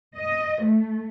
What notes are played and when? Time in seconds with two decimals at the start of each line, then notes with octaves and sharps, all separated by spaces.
0.16 D#5
0.63 A3